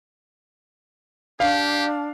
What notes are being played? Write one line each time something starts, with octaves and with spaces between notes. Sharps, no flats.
D4 G4 F5